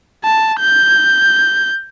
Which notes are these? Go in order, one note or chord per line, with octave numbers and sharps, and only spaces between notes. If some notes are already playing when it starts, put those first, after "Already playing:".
A5
G6